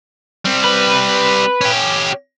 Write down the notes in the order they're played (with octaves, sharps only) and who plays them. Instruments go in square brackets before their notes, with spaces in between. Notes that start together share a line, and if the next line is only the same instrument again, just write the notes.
[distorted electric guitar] G3 C4
[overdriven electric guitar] B4
[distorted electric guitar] C#4 G4